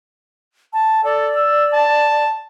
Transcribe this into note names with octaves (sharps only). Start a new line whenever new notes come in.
A5
A4 D5
E6
A5